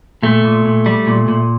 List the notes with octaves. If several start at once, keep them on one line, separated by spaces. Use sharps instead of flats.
A#2 A3
A#2
A#2
G3
A#2
A#2